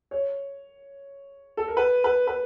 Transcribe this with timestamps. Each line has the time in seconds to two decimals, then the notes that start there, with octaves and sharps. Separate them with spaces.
0.11 C#5
1.57 A4
1.68 A#4
1.77 B4
2.04 B4
2.27 B4